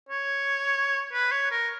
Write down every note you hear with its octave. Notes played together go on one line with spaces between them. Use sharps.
C#5
B4
C#5
A#4